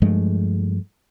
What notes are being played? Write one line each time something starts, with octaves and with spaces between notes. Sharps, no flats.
G2 F3 G#3 A3